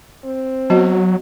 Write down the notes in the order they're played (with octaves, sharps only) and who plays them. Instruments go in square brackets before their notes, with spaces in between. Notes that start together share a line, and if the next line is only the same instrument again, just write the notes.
[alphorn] C4
[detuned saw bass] F#3 [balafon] B3 F#4 D#5